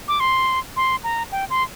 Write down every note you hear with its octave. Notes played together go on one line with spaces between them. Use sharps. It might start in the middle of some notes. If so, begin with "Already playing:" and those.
D6
C6
C6
A#5
G5
C6